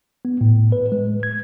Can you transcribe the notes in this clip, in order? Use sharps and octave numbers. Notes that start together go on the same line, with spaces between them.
B3
A2
B4
G#3
G#6